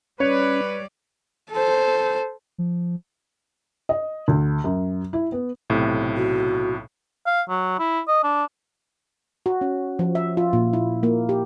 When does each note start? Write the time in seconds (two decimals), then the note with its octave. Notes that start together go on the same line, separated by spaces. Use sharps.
0.20 G3 C#4 B4 C#5 D5
1.52 A4 C5
2.58 F3
3.89 D#5
4.28 D2
4.64 F#2
5.13 E4
5.32 B3
5.70 B1 A2 C3
6.16 F#4
7.26 F5
7.49 F#3
7.79 E4
8.08 D#5
8.23 D4
9.46 F#4
9.61 C#4
9.99 F3
10.15 E5
10.37 F4
10.53 A#2
10.73 E4
11.03 A#3
11.29 G4